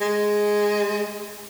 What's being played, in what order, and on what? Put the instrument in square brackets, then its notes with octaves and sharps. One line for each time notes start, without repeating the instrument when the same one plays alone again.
[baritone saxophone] G#3